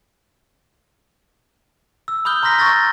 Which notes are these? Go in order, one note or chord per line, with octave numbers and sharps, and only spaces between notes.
E6
B5 D#6 F6 G6 G7
A#5 C6 F6 A#6 B6
C#6 E6 A6 A#6